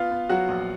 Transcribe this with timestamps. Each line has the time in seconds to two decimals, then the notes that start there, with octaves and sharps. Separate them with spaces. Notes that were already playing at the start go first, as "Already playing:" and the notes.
Already playing: B3 F4 F5
0.11 B3
0.29 F#3 F#4 F#5
0.48 A#1